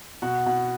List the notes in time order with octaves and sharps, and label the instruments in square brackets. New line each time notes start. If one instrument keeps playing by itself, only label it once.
[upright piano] B2 F#4
B2